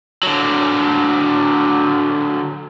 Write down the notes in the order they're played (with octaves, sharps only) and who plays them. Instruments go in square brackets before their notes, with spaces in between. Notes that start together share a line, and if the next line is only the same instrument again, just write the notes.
[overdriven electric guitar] D3 F#3